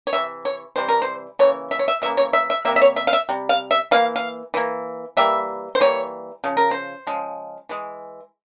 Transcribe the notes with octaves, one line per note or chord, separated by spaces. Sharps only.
C#5
C3 E3 E5
C#5
C3 E3 G3 C5
A#4
C5
C#3 E3 A#3 C#5
E5
C#5
E5
C#3 E3 A#3 E5
C#5
E5
E5
C3 G3 A#3 E5
E5
C#5
E5
F5
E5
C3 G3
F5
E5
E3 A#3 F5
F5
E3 A#3
E3 G3 A#3 E5
C5
E3 G3 A#3 C#5
C#3 F3
A#4
C5
C#3 F3 G#3
E3 G#3